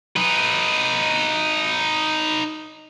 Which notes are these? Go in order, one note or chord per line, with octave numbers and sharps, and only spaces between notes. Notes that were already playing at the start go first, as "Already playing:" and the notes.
D#4 B4